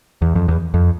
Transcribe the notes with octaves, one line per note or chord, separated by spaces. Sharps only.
E2
F2
E2
F2